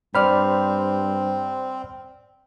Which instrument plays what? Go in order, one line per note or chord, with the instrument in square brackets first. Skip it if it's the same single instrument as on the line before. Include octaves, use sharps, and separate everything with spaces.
[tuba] G2 [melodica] C4 [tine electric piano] C5 F6 [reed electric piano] D5 B5